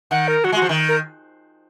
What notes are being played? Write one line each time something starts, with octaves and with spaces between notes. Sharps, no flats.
D#3 F#5
A#4
F#3 F#4
G#3
F#4
F3
D#3
A#4